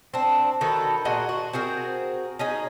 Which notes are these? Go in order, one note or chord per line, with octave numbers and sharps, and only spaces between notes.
C4 D4
D#3 F#4 A4 B4
A#2 F#4 G#4 D#5
F#4
C4 F#4 G#4 A#4
C#4 D#4 G#4